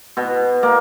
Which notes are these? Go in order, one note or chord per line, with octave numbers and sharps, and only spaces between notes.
B2
A#3